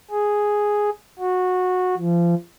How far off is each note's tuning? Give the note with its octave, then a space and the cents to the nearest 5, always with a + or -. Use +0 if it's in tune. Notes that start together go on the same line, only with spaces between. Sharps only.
G#4 +0
F#4 -15
F3 -30